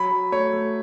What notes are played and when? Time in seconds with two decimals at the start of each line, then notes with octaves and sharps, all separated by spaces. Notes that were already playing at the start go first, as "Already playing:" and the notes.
Already playing: F#3 B5
0.11 F#3
0.32 A3 C#5
0.53 A3